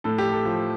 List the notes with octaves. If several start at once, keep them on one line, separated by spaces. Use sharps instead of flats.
A2 A4
G4
A4
F3